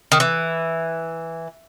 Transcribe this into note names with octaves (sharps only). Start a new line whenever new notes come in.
D#3
E3